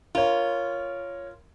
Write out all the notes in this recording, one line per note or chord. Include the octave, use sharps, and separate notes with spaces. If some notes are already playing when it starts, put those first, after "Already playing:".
F4 A#4 C#5